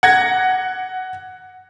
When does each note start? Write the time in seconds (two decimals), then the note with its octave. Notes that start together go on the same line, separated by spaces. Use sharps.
0.03 F#5 G#6 A#6